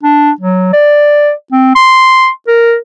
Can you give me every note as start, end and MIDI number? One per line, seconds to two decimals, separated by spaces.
0.03 0.31 62
0.41 0.72 54
0.73 1.31 74
1.52 1.74 60
1.75 2.29 84
2.47 2.76 70